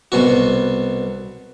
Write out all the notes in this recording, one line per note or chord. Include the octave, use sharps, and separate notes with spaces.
C2 B2 F#4